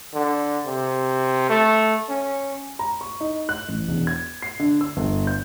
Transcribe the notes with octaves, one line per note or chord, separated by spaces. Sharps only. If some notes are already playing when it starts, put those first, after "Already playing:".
D3
C3
A3
C#4
A#5
C#6
D#4
F#6
A1
E1
G#6
C7
D3
E6
G1
G6